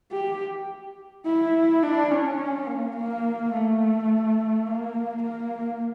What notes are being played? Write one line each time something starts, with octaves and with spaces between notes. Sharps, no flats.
G4
E4
D4
C#4
A#3
A#3
A3
A#3
A#3